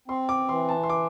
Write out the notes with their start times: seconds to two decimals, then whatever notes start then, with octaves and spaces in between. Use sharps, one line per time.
0.08 C4 C6
0.29 D6
0.49 E3 C6
0.69 A5
0.83 C6
0.90 D6